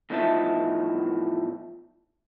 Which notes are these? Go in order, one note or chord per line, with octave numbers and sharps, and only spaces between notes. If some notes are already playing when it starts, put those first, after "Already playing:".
E2 A2 F3 D#4 E5 A5